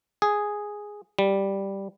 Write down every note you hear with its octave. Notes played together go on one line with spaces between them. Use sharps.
G#4
G3